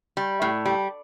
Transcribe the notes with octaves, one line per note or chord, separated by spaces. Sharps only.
G3
A2
G3